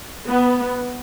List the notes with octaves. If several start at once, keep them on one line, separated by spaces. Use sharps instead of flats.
B3